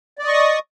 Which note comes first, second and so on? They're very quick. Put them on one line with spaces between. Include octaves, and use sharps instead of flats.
D5 D#5 C#6 D#6